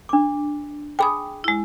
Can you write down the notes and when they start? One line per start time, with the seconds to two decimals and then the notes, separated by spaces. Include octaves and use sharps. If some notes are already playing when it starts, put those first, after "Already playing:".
0.09 D4 D6
0.99 G#4 G5 G#5 B5 D#6
1.44 G#3 E4